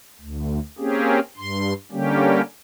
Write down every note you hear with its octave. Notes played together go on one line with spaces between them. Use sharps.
D2
A#3 C4 C#4 G4 G#4
G2 C6
D3 G3 A#3 C#4 G4